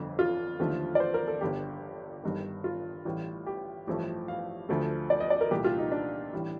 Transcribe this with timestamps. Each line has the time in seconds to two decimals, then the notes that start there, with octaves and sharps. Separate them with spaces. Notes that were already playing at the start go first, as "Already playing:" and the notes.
Already playing: G1 F2 D3
0.19 F4
0.59 D#2 D3 F3 A3
0.95 D5
1.00 C5
1.14 A#4
1.27 A4
1.41 G1 G2 D3 G4
2.23 G1 G2 D#3
2.64 F4
3.05 A1 A2 G3
3.46 G4
3.87 A1 G2 F3 A3
4.28 F5
4.69 D2 D3 F3 A3
5.10 D5
5.20 D#5
5.30 D5
5.41 A#4
5.51 C2 A#2 A3 G4
5.64 F4
5.78 D#4
5.92 D4
6.33 A1 A2 G3